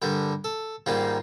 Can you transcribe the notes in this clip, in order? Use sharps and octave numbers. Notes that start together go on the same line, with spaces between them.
G2 D3 G3 A#4
A4
G#2 D#3 G3 A#3 F4